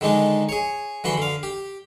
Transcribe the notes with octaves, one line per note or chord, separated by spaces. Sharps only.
D3 D#3 G#3 D4 D#4
G#4 C#5
D3 E3 F#4 B5 C6
D3 F5
G4